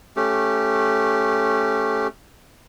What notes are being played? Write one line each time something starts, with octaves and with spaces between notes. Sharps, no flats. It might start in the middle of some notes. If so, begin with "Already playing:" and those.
A3 C#4 G4